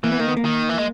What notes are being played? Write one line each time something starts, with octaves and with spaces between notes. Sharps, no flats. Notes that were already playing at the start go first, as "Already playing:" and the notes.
E3 A#3
B3
D#3 A#3
B3
A#3
D#3
E3
G#3